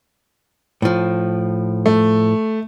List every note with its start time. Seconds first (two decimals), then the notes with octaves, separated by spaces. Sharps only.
0.82 A2 F3
1.86 A3